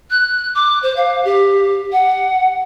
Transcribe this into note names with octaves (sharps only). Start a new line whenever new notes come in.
F#6
D6
C5
F5
G4
F#5